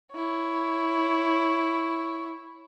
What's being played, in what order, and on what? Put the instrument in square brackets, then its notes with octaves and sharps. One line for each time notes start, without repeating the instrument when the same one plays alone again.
[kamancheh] E4 C#5